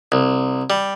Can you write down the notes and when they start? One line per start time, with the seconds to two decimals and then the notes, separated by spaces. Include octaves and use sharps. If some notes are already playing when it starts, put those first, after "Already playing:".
0.12 C2
0.70 G3